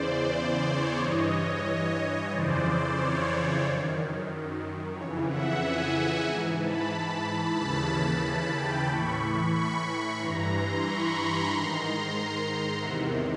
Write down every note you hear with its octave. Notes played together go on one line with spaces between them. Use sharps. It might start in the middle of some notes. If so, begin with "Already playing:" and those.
Already playing: E2 C#3 E3 C5 D5
C5 D5
C#5
G2 E3 C#5 D#5
F2 C#3 E3 C5 D5
C#5
F#2 D#3
F2 C#3 E3 C#5
E5 F#5
F#5 G#5
G#2 E3 G#5 A#5
A5 B5
D#2 C#3 E3 A5 B5
A5 B5
G5 A5
A2 E3 B5 C#6
B5 C#6
G2 E3 A#5 C6
A#5 C6
B5 C#6
G#2 D#3 A#5 C6
E2 C3 D#3 E5 F#5